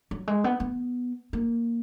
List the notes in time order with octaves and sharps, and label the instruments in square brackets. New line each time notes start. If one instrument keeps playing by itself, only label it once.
[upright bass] F#3
G#3
B3
B3
A#3